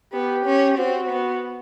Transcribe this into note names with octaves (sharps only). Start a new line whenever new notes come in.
B3 G4
C#4
C4 F#4
B3